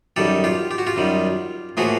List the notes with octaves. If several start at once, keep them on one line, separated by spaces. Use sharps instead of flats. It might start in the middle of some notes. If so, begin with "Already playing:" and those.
F#2 D#3 G3 G4 A4
F4 G4
G4
F#4
F4 G4
F#2 D#3 G3
A2 F3 A#3 F#4 G#4